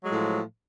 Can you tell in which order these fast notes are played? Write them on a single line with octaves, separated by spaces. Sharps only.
F#3 G#3 A2 F3